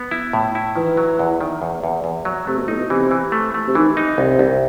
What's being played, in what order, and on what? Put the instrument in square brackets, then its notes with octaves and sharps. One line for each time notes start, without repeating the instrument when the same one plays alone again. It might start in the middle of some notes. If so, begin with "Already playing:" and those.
Already playing: [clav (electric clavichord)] B3
E4
A2
E4
[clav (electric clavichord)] D#3 [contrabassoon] E3
[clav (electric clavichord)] F#3
E2
D#3
E2
E2
E2
F#3
[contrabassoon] C3 [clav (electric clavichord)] A3
[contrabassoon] B2
[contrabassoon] A2 [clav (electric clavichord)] D#4
[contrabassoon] B2
[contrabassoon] C3 [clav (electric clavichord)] E3
[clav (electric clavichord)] E3
A3
A3
[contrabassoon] C3
[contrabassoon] D#3 [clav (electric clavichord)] E3
[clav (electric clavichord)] D#4
[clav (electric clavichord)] C2 [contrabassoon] C3
[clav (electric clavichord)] C2